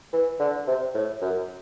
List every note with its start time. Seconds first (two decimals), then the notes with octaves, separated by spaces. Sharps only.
0.13 E3
0.39 D3
0.67 C3
0.94 A2
1.21 F#2